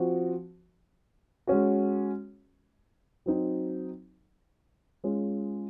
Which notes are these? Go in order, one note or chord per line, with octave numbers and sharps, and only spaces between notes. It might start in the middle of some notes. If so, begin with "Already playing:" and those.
Already playing: F3 C4 F#4
G#3 C#4 F#4
F#3 C4 D#4
G#3 C#4 F4